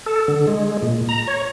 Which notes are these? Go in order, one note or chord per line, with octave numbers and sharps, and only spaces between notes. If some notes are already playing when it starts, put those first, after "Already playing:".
A4
D3
G#3
A#2
A#5
C#5